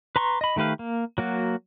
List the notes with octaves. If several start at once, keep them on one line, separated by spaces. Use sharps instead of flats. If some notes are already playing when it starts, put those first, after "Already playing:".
B4 A#5 C6 C#6
D#5 B5
D#3 A3 G4 B4 F5
A#3
F#3 A#3 F#4